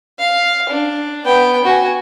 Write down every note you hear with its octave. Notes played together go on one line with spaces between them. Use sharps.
F5
D4
B3 G5
F#4 G#5